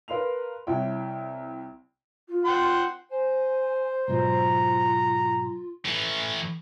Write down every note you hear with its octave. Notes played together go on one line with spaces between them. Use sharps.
A#4 B4 F5 C6 F7
C2 E4 C#5 G5
F4
F#5 G5 C6
C5 G#5
G#2 B2 F#3 F4 A#5
A2 E3